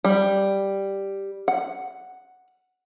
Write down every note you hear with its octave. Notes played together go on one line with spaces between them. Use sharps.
G3
F#5